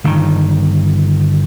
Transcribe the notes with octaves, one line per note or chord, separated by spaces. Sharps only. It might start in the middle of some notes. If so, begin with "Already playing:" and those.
G1 G2 D#3